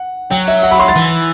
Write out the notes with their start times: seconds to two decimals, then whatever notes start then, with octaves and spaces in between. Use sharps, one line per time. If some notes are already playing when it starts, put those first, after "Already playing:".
Already playing: F#5
0.31 F#3 G5
0.48 E5
0.63 F#5
0.71 B5
0.80 C6
0.88 A6
0.96 E3